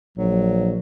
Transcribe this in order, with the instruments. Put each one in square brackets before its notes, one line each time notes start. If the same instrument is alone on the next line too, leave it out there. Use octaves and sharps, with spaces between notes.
[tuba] A#1 [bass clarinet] F#3